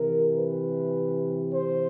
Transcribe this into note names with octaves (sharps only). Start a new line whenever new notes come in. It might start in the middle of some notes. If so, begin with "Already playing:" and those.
Already playing: C3 E3 A#4
B4
C5